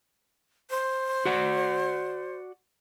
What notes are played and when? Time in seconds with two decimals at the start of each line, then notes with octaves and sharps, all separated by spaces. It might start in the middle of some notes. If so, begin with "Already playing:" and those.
0.70 C5
1.25 F#4 D5 F#5